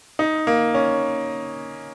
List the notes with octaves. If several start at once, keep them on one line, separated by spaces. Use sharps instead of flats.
D#4
A#3
C#4